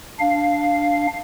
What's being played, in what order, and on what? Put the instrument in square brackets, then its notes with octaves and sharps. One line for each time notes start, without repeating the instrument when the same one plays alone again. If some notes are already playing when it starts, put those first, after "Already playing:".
[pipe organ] D4 F5